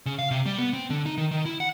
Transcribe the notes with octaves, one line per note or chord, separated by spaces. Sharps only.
C#3
F5
C3
G3
B3
C4
D3
D#4
D#3
D#3
E4
F#5